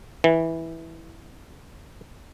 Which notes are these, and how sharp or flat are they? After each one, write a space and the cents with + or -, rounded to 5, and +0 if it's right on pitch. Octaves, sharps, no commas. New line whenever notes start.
E3 -10